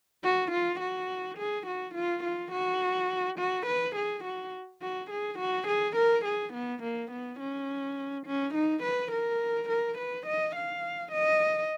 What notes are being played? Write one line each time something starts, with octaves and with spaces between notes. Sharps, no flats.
F#4
F4
F#4
G#4
F#4
F4
F4
F#4
F#4
B4
G#4
F#4
F#4
G#4
F#4
G#4
A#4
G#4
B3
A#3
B3
C#4
C#4
D#4
B4
A#4
A#4
B4
D#5
F5
D#5